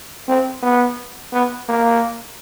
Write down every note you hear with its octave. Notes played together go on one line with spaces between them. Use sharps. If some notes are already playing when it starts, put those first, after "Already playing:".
C4
B3
B3
A#3